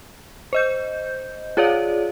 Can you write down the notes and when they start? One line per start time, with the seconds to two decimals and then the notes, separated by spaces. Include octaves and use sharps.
0.53 C5 D#5 G6
1.57 F4 G#4 C#5 D5 F5